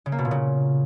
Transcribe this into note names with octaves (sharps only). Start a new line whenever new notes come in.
C#3
A#3
B2
A#2
C#3